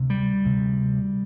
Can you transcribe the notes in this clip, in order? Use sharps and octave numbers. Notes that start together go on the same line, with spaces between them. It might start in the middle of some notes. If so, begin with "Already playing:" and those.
Already playing: D2 C3
G3
D2 C3